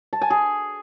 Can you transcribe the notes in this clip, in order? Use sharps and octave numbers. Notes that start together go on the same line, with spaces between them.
A5
G#5
G#4